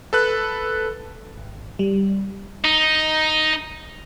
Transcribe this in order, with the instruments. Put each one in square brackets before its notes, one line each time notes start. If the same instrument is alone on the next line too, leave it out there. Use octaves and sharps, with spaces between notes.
[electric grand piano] A4 B4 F#6
[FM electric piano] G#1
G3
[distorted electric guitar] D#4